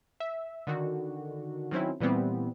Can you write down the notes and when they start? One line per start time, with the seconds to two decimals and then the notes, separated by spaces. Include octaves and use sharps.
0.20 E5
0.67 D3 D#3 F#4
1.71 D#3 F#3 C4 C#4 E4
2.00 A#2 E3 G3 B3 C4